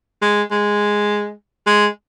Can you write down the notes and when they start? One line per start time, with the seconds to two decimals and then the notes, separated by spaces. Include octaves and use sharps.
0.22 G#3
0.51 G#3
1.66 G#3